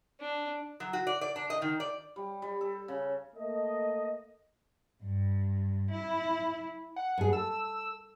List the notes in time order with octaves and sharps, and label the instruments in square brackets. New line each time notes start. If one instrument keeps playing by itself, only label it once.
[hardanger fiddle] D4
[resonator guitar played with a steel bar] F#3
F#4
D5
D5
D4
D#5
D#3
D5
[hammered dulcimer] G3
G3
A4
C#3
[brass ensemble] A3 A#3 D#5
[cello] G2
E4
[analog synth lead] F#5
[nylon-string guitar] G2 G#4
[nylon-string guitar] A4 [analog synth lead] E6